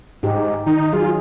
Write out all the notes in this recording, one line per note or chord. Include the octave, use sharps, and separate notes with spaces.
G#2 D#4 G4
D#3 D#4
F#3 F4 G#4